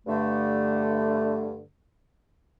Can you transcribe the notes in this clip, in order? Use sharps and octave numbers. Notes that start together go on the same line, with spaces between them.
G2 D3 A3